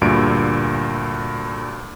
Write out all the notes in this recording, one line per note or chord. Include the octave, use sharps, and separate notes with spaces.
D2 G2 A#2 D7